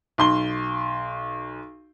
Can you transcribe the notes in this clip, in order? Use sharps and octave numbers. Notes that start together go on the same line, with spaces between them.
B1 C6 G7